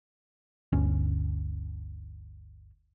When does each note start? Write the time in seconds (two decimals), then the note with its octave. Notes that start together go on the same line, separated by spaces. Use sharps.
0.72 G1 D2 C#4